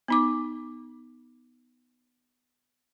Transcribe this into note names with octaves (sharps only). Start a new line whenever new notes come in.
B3 D#4 D6